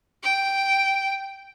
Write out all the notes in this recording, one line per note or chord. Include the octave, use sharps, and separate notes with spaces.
G5